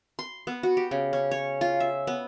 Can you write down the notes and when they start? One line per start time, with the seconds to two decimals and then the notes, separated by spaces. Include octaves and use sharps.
0.19 C6
0.47 B3
0.63 F#4
0.77 G4
0.91 C#3
1.13 C#4
1.31 C#5
1.61 F4
1.80 E5
2.07 B3